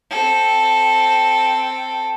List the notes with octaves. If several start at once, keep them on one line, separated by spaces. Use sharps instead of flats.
C4 A4